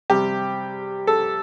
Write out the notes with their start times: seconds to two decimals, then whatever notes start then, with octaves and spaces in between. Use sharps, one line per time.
0.10 C3 G3 G4
1.07 A4